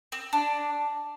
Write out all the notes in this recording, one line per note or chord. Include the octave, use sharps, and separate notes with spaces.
C4
D4